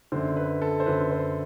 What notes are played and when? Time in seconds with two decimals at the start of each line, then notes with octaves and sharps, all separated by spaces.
0.12 F#2 D3 C5
0.36 B4
0.62 A4
0.80 C5
0.86 F#2 D3 B4
1.11 C5